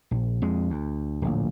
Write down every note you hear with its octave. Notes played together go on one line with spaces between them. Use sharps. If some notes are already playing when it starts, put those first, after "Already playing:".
A#1
F2 G#3
D2
D1 A#1